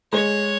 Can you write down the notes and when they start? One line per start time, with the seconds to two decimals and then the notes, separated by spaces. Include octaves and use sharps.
0.13 G#3 C#5